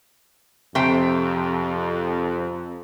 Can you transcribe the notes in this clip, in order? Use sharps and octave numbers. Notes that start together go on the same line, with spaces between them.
F2 C3 A3 G5